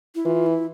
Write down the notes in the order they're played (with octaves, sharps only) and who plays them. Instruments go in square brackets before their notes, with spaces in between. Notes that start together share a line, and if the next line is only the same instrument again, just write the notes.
[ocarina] E4
[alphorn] E3 [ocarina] F4
[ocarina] E4